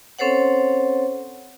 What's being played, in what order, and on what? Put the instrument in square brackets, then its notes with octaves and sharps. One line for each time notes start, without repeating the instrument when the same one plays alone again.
[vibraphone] C4 C#4 A4 C5 C#5 F#5